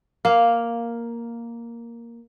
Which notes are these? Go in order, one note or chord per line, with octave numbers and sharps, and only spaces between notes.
A#3 F5